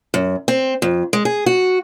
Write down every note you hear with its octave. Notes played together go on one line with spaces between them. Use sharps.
F#2
C4
F2
G#3
G#4
F#4